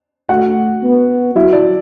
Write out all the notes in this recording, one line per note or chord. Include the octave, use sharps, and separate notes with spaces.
A3 F#4 F#5
B3
F#3 E4 E5
D4 D5